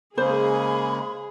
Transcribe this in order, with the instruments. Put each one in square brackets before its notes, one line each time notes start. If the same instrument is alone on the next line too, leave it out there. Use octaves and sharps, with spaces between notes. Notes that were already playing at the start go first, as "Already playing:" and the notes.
[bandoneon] C#3 G#3 A#3 [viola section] G#4 [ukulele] C5 [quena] B5